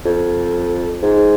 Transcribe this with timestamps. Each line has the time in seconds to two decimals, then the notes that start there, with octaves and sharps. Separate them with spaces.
0.05 F2
1.03 G#2